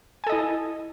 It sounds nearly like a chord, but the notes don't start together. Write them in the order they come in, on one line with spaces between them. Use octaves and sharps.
G#5 A4 D#5 E4